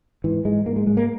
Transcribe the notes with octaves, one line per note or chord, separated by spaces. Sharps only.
G#2 E3
G#2 G#3
G#2 A#3
G#3
G#2 G#3
A#3